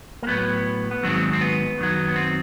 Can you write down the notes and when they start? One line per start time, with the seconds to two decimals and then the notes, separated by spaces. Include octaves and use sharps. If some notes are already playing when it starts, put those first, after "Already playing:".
0.23 A#3
0.27 A2 F#3 B3
0.91 B3
1.03 G#2 D#3 F#3 C4
1.33 C4
1.41 B3
1.78 F#2 D#3 F#3
2.08 B3
2.16 C4